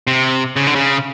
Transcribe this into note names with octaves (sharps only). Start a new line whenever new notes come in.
C3
C#3
D3
C#3